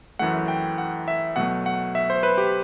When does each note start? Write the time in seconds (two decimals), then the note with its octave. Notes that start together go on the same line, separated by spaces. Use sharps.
0.19 F#2 E3 A3 F#5
0.48 G5
0.78 F#5
1.08 E5
1.36 B2 F#3 A3 F#5
1.66 F#5
1.95 E5
2.10 C5
2.23 B4
2.38 G4